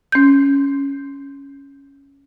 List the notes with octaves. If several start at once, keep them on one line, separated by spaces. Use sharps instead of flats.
C#4 G6